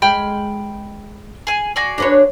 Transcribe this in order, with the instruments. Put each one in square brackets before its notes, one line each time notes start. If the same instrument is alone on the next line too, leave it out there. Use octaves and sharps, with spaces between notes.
[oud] G#3 [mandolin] G5 B5 F6
[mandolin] G#4 G#5
F#4 G#4 D5
[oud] D4 B4 C#5